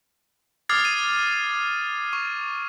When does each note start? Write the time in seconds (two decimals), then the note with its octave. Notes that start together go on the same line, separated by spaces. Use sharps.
0.69 D6 D#6 F6 G#6 A6 C7
0.85 D#7
2.13 C#6